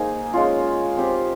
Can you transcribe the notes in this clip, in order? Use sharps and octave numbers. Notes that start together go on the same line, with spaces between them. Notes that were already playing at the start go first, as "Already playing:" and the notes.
Already playing: A#3 D#4 G#4 C5
G#3 C#4 F4
C4 G4 C5